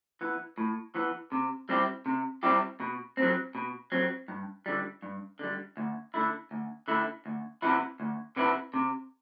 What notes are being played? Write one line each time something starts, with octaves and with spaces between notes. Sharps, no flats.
E3 B3
A2
E3 B3
C3
G3 C4 E4 G4
C3
G3 C4 E4 G4
B2
F#3 C4
B2
F#3 C4
G2
D3 G3
G2
D3 G3
D2
D3 A3 E4
D2
D3 A3 E4
D2
C3 E3 B3 E4
D2
C3 E3 B3 E4
C3